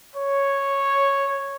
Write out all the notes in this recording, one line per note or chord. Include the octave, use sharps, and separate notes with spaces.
C#5